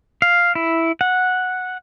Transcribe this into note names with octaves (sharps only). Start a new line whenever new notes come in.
F5
E4
F#5